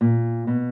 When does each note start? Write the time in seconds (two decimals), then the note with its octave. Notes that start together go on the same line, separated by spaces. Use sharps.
0.01 A#2
0.47 B2